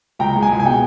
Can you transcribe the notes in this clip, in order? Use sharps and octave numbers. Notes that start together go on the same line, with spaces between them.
C#2 G5 A#5
G#3
G#5
C#2
G#5
B2 G5